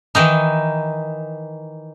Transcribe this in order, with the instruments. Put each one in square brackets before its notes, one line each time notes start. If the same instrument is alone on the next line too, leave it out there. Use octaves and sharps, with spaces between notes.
[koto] D#3 E3 D#4